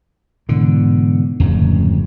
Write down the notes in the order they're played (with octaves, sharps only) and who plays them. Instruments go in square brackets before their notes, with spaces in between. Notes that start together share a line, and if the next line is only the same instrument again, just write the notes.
[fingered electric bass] G#2 B2 E3 [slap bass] D3
[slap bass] D1 F2 G#2 [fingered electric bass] C#3